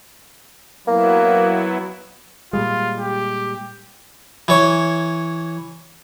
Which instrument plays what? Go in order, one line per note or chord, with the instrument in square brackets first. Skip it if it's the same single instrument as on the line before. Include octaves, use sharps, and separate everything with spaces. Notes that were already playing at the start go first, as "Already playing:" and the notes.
[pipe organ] F#3 B3 E4 [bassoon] A#3
[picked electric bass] A#2 G3 G#3 [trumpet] F4
[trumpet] G4
[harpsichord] E3 C#5